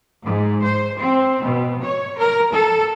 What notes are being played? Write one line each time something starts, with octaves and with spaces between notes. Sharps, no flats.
G#2
C5
C4
B2
C#5
A#4
A4